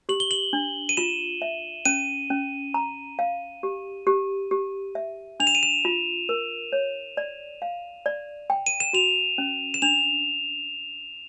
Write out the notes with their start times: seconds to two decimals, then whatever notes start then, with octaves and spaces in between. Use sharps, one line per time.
0.09 G4 F#7
0.20 G7
0.31 F#7
0.53 D4
0.89 D#7
0.97 F4 E7
1.42 E5
1.85 C#4 D#7
2.30 C#4
2.74 A#5
3.19 F5
3.63 G4
4.07 G4
4.51 G4
4.95 E5
5.40 D4 F7
5.47 E7
5.55 D#7
5.63 E7
5.85 F4
6.29 A#4
6.73 C#5
7.17 D5
7.62 F5
8.06 D5
8.50 G5
8.67 D#7
8.80 E7
8.93 F#4 F7
9.38 C#4
9.74 E7
9.82 D4 F7